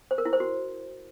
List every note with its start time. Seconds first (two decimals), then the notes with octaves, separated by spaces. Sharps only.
0.11 C5
0.18 A#4
0.25 E4
0.33 C5
0.40 F#4